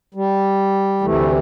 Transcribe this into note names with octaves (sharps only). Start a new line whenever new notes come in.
G3
D2 C3 E3 A3